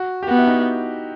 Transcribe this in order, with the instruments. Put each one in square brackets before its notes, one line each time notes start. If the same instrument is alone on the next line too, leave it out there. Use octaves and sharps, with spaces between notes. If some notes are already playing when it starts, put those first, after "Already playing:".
Already playing: [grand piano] F#4
G4
[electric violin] B3 [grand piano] F#4
[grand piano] E4
D#4